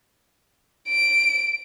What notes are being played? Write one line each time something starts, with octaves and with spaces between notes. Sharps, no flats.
D7